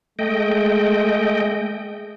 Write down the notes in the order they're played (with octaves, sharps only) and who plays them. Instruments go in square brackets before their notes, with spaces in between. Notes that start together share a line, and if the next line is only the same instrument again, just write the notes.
[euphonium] G#3 [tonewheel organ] A3 D#5 G5